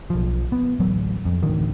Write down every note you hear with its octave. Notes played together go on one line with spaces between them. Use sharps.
B1 F3
B3
D1 A1 F#3
F2
A1 D2 D#3